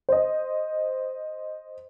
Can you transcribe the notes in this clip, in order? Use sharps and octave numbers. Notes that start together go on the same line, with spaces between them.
C5 D#5